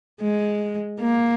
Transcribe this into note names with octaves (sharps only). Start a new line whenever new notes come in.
G#3
A#3